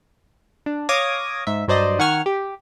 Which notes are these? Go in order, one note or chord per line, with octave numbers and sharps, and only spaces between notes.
D4
C#5 F5 D6 D#6 G#6 A#6
G#2 E5
G2 F#3 C5 D5 D#5
D#3 F#5 G#5 C#6 F6
G4